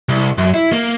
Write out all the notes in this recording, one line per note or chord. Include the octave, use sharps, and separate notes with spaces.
C2
F#2
E4
A#3